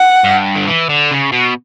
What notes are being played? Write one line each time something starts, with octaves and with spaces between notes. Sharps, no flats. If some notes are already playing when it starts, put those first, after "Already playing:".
Already playing: F#5
G2
D3
E3
D3
C#3
B2